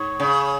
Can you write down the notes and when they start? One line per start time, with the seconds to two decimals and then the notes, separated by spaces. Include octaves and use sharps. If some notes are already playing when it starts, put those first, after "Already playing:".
Already playing: G#2 C#5
0.20 C#3